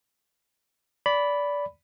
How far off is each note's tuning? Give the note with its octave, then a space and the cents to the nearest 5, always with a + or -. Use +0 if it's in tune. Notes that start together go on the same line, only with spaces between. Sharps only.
D5 -20 B5 +0